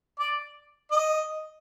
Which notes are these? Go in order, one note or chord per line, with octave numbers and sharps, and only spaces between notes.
D5
D#5